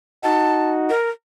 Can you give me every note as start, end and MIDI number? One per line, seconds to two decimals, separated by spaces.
0.24 0.90 63
0.24 0.90 66
0.24 0.71 81
0.90 1.10 70